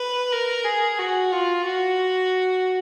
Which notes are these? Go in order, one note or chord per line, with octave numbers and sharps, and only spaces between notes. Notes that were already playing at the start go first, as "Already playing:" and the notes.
Already playing: B4
A#4
G#4
F#4
F4
F#4